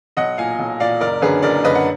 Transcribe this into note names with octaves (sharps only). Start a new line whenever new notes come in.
B1 D#5 F#5
A#2 F5 G#5
B1
A#2 D5 F5
F#1 A#4 D5
F#2 D3 G#4 B4
F#1 A#4 D5
F#2 D3 B4 D#5
F#5